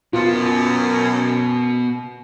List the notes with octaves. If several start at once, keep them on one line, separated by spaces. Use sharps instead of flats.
F#2 B2 B3 F4